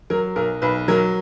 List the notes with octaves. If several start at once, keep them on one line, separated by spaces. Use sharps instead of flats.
F#3 A#4
B1 A#4
B1 B4
F#3 A#4